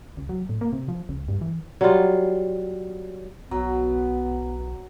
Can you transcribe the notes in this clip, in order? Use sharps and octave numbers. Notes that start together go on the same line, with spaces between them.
C#2
F#3
A2
A#3
C3
F3
C#2
G2
E3
F#3 G3 F4
B1 F#3 B3